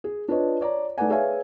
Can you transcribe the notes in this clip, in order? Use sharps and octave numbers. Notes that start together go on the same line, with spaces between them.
G#4
D4 F4 B4 C#5 D#5
C#5 D5 A#5
A3 D#4 B4 D5 F#5 G#5
G#4 B4 C#5 E5 F5 G#5